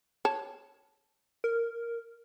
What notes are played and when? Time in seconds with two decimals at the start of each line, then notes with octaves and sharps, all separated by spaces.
0.25 C#5 A5
1.44 A#4